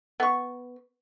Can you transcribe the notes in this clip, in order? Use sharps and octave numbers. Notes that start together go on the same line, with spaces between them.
B3 C#6